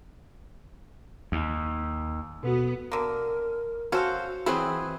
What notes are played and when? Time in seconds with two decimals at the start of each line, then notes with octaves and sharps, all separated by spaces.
1.32 D#2
2.43 B2 B3 F#4
2.92 D3 A#3 A#4
3.92 C#4 F#4 A4 C5 F5
4.46 E3 F#3 C4 E4 G#4 B4